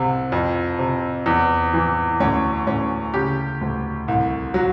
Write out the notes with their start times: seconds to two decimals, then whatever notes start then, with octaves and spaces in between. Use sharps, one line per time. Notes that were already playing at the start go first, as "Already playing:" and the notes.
Already playing: C2 C3
0.32 F2
0.79 C3
1.26 E2
1.73 E3
2.20 D2 C#4
2.67 D2 C#4
3.14 C#3 G4
3.61 D2
4.08 C2
4.54 F#3